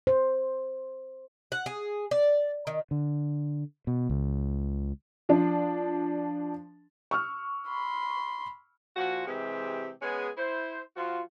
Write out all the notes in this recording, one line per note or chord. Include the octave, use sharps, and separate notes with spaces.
C5
F#5
G#4
D5
D#3
D3
B2
C#2
F3 D4
C#6 E6 F6
B5 C6
A#2 F3 F#4
C3 E3 G#3 G4 E5
G#3 B3 C#4 G#4
E4 C5
F3 F4 F#4